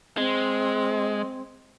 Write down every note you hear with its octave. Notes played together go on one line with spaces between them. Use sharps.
G#3 C4